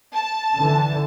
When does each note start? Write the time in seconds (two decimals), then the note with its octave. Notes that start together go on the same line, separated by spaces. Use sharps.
0.14 A5
0.57 D3 E3